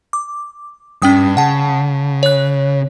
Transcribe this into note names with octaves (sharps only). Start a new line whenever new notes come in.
D6
G2 C#4 G5 D#6
C#3 F#5 A5
C#5 F#6